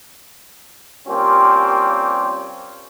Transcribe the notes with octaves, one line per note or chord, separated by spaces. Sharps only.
G3 A#3 C4 C#4 F4 G4